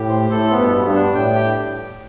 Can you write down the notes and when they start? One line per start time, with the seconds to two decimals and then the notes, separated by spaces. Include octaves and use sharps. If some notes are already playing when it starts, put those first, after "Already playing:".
Already playing: A2 G4
0.09 C5
0.30 A2 A4
0.50 B3
0.58 G2 B2
0.71 B3
0.86 G2
0.93 D4
1.15 A2 G5
1.35 G4